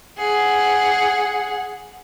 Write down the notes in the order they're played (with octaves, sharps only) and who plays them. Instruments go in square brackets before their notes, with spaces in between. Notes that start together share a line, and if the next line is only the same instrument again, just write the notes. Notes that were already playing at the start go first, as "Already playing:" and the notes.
[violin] G#4 F#5